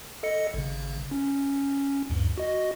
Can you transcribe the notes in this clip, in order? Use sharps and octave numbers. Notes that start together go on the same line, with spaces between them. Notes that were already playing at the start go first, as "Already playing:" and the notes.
A4 D#5 C#7
G#1 C#3
C#4
D2 G2
F#4 D#5